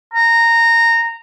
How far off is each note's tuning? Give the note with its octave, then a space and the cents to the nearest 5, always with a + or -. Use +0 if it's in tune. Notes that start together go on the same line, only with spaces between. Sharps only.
A#5 -15